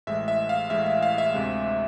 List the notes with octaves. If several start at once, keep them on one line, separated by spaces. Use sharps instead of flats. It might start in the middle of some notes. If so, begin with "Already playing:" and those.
A1 A2 G#3 E5
E5
F5
A1 A2 G#3 E5
E5
F5
E5
D2 C3 G#3